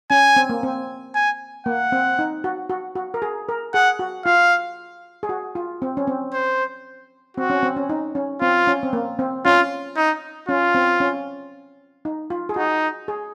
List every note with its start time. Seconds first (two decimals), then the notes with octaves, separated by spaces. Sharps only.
0.10 C#4 G#5
0.36 C4
0.49 A#3
0.63 C4
1.15 G#5
1.66 A#3 F#5
1.92 C4
2.19 D#4
2.44 F#4
2.70 F#4
2.96 F#4
3.14 A#4
3.22 G#4
3.49 A#4
3.74 G#4 F#5
3.99 F#4
4.26 F4 F5
5.23 G#4
5.29 F#4
5.55 F4
5.82 C4
5.97 C#4
6.07 C4
6.34 C5
7.37 C4 F#4
7.50 C#4
7.63 C4
7.77 C#4
7.89 D#4
8.15 C#4
8.41 C4 F4
8.67 C#4
8.83 C4
8.93 A#3
9.19 C4
9.45 C#4 F4
9.97 D#4
10.49 C#4 F4
10.75 C4
11.00 C#4
12.05 D#4
12.30 F4
12.49 G#4
12.56 D#4 F#4
13.08 G#4